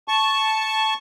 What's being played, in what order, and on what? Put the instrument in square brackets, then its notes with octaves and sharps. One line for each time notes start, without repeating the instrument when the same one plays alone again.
[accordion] A5 C#6